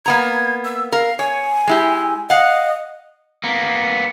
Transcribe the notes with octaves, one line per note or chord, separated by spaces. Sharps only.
A#3 B3 A#5 G#6
E6
A#4 F5
C#5 G#5
G#3 E4 G4
D#5 F5 F#5
A#3 B3